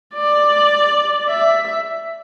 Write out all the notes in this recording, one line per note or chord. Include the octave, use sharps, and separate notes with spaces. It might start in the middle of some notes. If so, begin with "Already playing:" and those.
D5
E5